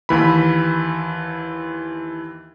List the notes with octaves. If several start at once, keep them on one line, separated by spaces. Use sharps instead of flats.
D#2 E3 B5